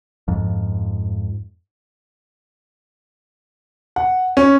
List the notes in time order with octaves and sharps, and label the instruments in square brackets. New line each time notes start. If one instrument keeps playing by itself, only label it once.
[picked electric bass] F2 G#2 F3
[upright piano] F#5
C#4